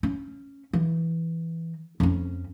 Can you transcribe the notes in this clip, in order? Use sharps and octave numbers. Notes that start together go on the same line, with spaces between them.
C#4
E3
F2 C#4